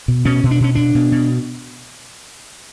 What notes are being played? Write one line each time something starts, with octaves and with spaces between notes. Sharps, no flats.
B2
B2 C#4
B2
D4
B2 C#4
B2 D4
B2
B2